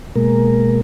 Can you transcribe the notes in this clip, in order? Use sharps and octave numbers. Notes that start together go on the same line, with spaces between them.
B2 G#3 A#3 A#4